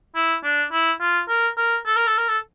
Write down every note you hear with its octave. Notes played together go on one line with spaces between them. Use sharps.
E4
D4
E4
F4
A#4
A#4
A4
A#4
A4
A#4
A4